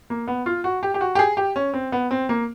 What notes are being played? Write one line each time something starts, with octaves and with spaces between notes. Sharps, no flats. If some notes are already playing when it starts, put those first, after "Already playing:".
A#3
B3
F4
F#4
G4
G4
F#4
G4
G#4
G4
C#4
C4
B3
C4
A#3